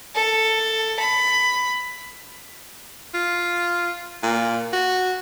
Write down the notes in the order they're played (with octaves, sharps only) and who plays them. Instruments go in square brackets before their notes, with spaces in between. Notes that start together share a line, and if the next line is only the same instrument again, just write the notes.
[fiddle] A4
B5
[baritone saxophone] F4
A#2
F#4